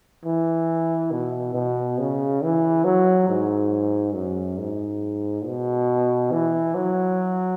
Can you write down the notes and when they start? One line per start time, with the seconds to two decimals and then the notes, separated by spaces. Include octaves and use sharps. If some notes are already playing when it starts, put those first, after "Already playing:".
0.25 E3
1.11 B2
1.55 B2
1.98 C#3
2.42 E3
2.84 F#3
3.28 G#2
4.14 F#2
4.58 G#2
5.45 B2
6.32 E3
6.75 F#3